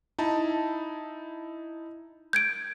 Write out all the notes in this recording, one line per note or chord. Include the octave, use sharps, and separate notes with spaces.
D#4 E4 A5
G6 G#6 D7